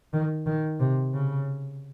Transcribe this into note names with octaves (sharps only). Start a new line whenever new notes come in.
D#3
D#3
C3
C#3